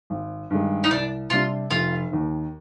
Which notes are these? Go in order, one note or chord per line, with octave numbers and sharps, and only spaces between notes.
G#1
G2 D#3 G#3
D#4
C2 D4
C3 G3 D4 F4
F1 F4
D#2 D#3